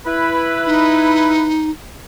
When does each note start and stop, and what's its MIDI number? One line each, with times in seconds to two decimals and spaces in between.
0.06 1.50 64
0.06 1.50 71
0.66 1.70 63